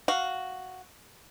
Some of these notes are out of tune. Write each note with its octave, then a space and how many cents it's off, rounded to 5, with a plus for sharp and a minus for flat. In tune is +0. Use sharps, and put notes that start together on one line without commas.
F#4 +0 F5 +0